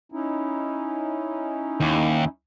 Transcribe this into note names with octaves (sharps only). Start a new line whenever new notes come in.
C#4 D#4 E4
D#2